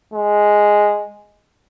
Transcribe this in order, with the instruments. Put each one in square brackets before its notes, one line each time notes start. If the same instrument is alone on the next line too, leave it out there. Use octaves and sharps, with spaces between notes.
[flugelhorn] G#3